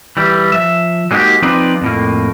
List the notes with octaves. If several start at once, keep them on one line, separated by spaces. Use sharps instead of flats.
E3 G3
F3 E5
F#3 G#3 A#3 D#4 F#4 G4
F3 C4 D#4 F4 B4 D5
F2 A2 A#3